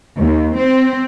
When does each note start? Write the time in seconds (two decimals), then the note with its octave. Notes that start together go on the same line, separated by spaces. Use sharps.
0.19 D#2
0.57 C4